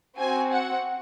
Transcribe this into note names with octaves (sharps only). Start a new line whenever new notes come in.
C4 F#4 G#5
F#5